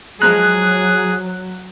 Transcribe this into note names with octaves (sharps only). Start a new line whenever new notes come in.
F3 F#3 G#3 G#4 A#5 F#6